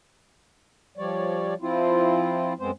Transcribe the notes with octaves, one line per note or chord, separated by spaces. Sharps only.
F3 G3 C#5 D5
F3 C4 E4 F4
F#2 G#3 B3 C4 C5